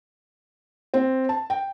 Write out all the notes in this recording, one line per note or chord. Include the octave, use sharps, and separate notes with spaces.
C4
A5
G5